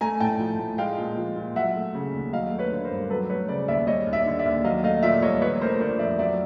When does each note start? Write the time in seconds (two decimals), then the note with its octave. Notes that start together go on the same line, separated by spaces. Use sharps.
0.01 A3 G#5 A#5
0.20 A2 G5 A5
0.40 F3
0.59 A2
0.78 G#3 F5 G5
0.98 A#2
1.17 F3
1.36 A#2
1.56 F#3 E5 F#5
1.76 A3
1.95 C#3
2.14 D#2
2.32 F#3 D#5 F5
2.52 A3
2.58 B4 C#5
2.72 D3
2.84 A#4 C5
2.91 G2
3.10 F#3 A4 B4
3.29 A3 B4 C#5
3.48 C#3 C5 D5
3.68 D#2 D5 E5
3.87 G3 C#5 D#5
4.07 D#2
4.13 D5 E5
4.26 D3
4.39 D5 E5
4.45 D#2
4.64 F#3 D#5 F5
4.84 A3 D#5 F5
5.03 A#2 D5 E5
5.22 C2 C#5 D#5
5.41 F3 B4 C#5
5.61 A3 A#4 C5
5.80 D3 C5 D5
5.99 F2 D5 E5
6.19 F#3 D5 E5